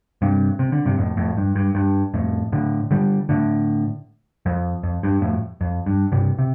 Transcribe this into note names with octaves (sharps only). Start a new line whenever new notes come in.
G2 C3
C3
D3
G2 C3
F2 A2
F2 A2
G2
G2
G2
F2 A2
A2 D3
D3 G3
A2 D3
F2
F2
G2
F2 A2
F2
G2
G2 C3
C3